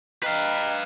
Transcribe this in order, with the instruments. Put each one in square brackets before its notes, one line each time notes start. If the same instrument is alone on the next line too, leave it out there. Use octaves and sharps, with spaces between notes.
[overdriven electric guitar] B4 F5 [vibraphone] D#5 G5 A#5